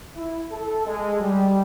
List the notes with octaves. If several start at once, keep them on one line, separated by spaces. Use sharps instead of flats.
E4
A4
G#3
G3